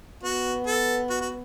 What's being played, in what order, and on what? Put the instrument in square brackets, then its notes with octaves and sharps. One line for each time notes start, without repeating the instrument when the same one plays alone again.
[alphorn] B3 [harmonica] F#4
[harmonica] A4
F#4
F#4